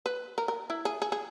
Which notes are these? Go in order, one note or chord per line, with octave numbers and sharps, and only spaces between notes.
B4
A#4
A#4
E4
G#4
G#4
G#4